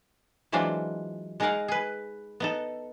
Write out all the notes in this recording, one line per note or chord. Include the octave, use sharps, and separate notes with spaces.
E3 F#3 G#3 C4 D4 F4
G#3 D#4 G#4 A#4 F5 F#5
G#4 B4
B3 D#4 A4